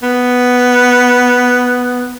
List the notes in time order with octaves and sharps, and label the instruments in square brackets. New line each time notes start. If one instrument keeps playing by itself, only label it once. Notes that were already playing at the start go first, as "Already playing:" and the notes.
[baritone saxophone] B3